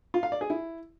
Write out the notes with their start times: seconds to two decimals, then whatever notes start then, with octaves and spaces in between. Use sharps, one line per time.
0.14 F4
0.23 F5
0.32 D5
0.41 G#4
0.50 E4